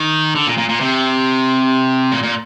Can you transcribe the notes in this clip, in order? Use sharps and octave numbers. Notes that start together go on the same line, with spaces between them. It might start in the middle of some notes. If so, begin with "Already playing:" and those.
Already playing: D#3
D3
A#2
A#2
A#2
C3
A#2
A#2